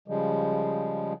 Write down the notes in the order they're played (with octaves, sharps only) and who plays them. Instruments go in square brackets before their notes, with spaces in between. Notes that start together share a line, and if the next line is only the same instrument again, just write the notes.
[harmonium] C#3 F3 G3 G#3